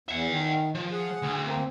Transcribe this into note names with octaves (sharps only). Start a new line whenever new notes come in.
E2 E5 F#5
D#3
F3
G#4 F#5
D2
A#3 C4